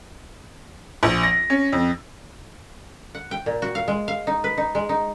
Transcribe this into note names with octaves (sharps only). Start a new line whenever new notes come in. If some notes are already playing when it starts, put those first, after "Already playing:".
A#1
A#6
C#4
F2
F#5
G5
A#2
F#4
F5
G#3
F5
D#4
B4
D#4
G#3
D#4